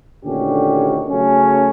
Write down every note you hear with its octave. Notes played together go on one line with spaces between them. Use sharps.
D2 A#2 D3 D#3 C#4 G4
C#3 F#3 A3 C#4